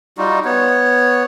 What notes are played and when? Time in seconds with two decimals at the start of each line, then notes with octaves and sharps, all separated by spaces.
0.18 G3 D#4 F4 F#4
0.45 B3 C#5